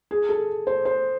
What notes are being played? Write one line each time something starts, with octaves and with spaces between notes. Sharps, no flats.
G#4
A4
C5
C5